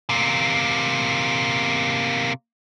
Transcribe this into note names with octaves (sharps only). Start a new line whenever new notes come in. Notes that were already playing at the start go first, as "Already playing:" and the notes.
C3 A#3